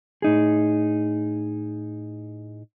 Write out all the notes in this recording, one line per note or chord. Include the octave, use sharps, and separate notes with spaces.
A2 D#4 G#4